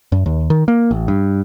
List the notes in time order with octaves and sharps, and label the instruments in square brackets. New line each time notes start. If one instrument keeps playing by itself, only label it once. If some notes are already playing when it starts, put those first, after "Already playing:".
[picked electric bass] F#2
D#2
D#3
A#3
A1
G2